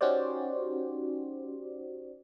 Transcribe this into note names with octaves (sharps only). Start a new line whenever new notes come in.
C#4 D#4 F#4 G4 C5 D5